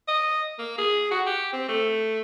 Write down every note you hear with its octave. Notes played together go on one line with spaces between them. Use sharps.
D#5
A#3
G#4
F#4
G4
C4
A3